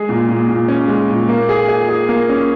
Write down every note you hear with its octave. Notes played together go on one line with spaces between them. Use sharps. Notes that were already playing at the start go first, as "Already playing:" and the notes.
Already playing: G#3 G#4
A#2
A#2
A#2
C#4
G#3
A#2
A#3
G#4
G#4
G#4
A#3
C#4